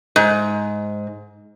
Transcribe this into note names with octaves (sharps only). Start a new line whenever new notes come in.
G#2